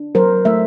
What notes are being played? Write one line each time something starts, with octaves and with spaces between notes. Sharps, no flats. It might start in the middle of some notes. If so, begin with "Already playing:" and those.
Already playing: D4
F#3 A#4 C5
A3 E5